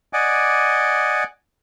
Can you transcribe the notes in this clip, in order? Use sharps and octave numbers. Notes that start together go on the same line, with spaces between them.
D5 D#5 F#5 G#5 D6